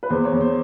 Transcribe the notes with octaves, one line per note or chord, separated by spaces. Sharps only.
B4
E2 C5
C#5
E2
C5